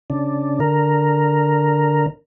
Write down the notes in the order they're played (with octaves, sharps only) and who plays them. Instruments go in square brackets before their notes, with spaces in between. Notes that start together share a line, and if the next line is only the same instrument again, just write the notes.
[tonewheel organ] C#3 D4
D3 A#4